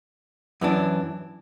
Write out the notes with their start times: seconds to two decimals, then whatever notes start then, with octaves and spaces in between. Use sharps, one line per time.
0.61 F#2 E3 D4